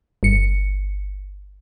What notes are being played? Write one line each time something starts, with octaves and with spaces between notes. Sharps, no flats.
G1 C#7